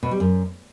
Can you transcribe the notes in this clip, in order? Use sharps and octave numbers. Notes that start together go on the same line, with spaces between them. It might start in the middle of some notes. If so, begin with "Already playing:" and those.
B2
G3
F#2